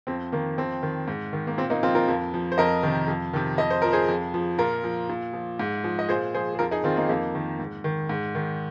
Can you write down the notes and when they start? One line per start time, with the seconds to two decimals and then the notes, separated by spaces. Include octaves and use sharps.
0.07 F2 C4
0.32 D#3 A#3
0.58 F2 C4
0.83 D#3
1.08 G#2
1.33 D#3
1.47 A#3
1.58 A#2 C4
1.70 A#3 D#4
1.83 F3 C4 F4
1.95 F4 A#4
2.08 F2
2.34 F3
2.52 C5
2.58 F2 A#4 D#5
2.83 C3 D#3
3.08 F2
3.33 C3 D#3
3.58 F2 D#5
3.70 C5
3.82 F3 A#4
3.93 G#4 C5
4.08 F2
4.34 F3
4.58 A#2 F4 A#4
4.84 F3
5.09 A#2
5.33 F3
5.59 G#2
5.84 F3
5.99 D#5
6.09 A#2 G#4 C5
6.34 F3 G#4 C5
6.55 G#4
6.59 F2 F4 A#4
6.71 D#4 G#4
6.84 D#3 C4 F4
6.97 A#3 D#4
7.09 F2 A#3 D#4
7.35 D#3
7.59 G#2
7.84 D#3
8.09 G#2
8.35 D#3